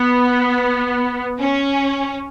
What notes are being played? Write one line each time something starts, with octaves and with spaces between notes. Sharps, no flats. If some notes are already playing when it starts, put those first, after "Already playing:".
Already playing: B3
C#4